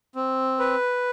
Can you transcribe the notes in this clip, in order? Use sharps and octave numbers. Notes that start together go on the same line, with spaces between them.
C4
B4